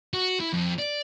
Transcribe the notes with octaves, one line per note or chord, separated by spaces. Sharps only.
F#4
E4
F2
D5